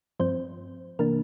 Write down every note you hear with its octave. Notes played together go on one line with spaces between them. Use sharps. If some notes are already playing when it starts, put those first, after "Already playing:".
G2 F3 C4 C5
C3 E3 A#3 D4 A#4